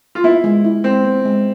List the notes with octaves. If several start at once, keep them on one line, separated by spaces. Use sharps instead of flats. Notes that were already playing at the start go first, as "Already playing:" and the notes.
F4
B3 E4
G#3
E4
G#3 C4
B3
G#3